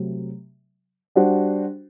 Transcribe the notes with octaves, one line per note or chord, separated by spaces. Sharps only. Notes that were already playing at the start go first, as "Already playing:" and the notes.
Already playing: C3 F#3 A3
G3 D4 F#4 C5